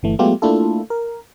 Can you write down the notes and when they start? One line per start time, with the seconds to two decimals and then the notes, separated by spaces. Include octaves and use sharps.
0.03 G1 E3 A3
0.19 F#3 G#3 A3 B3 F4 G4
0.42 A3 A#3 D4 E4 F4 A4
0.90 A#4